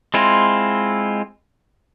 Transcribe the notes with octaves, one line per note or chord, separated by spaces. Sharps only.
G#3 C4 E4 F4